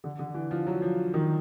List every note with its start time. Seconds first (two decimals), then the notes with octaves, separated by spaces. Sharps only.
0.04 D3
0.19 D3
0.34 E3
0.51 F3
0.67 F#3
0.82 F3
1.14 D#3